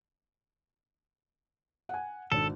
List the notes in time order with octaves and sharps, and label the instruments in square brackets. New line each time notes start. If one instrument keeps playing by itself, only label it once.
[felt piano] F#5 G#5
[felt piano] G#1 D4 [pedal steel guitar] A4